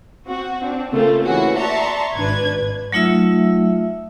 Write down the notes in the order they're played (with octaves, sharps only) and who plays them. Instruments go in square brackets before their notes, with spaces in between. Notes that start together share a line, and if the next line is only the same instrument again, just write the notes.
[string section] C4 F#4
C4 D4
C#3 A3 A#3 C4 F4 C5
E3 C#4 F#4 G#4
D5 E5 A5 A#5 C6 C#6
G#1 D4 B4 G#6
[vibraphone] F#3 A3 D#4 F4 E5 E6